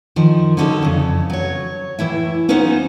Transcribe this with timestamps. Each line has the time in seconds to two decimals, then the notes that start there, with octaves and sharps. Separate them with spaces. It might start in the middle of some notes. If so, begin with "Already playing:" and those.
0.16 D#3 F3
0.57 D3 F#3 C#4 D#4 E4 A4
0.83 F2 C#3
1.30 F#3 C#5
1.99 A2 E3 E4 E5
2.48 B3 C#4 D#4 F4 C5 F#5